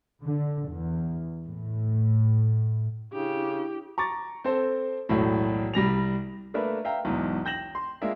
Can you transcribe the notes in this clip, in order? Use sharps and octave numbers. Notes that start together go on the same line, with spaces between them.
D3
E2
A2
C#3 D4 E4 G4
A#5 C#6 D6 A6
C4 A4 C5
E1 B1 A2
C2 G3 A#6 F7
A3 A#3 D4 A#4 B4 E5
E5 F5 G5 A#5
B1 E2 G#2
G5 G6 A#6 E7 F#7
C6
G#3 A#3 D4 F4 A#4 E5